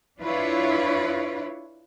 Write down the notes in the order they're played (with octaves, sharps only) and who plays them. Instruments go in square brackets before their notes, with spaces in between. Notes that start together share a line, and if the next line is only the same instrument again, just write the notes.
[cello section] D4 E4 F4 B4 C#5